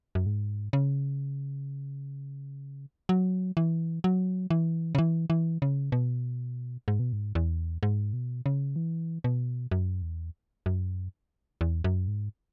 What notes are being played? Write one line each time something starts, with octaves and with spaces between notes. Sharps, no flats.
F#2
G#2
C#3
F#3
E3
F#3
E3
C#3
E3
E3
C#3
B2
G#2
B2
G#2
E2
G#2
B2
C#3
E3
B2
F#2
E2
F#2
E2
F#2
G#2